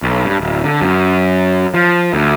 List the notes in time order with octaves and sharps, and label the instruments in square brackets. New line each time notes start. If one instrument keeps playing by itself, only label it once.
[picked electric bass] B1
G2
D1
D3
F#2
F3
D2